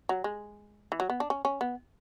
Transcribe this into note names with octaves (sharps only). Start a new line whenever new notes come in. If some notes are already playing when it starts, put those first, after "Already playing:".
F#3
G#3
E3
F#3
B3
D4
C#4
C#4
B3